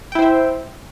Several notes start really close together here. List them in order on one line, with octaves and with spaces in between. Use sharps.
G5 E4 C5 E5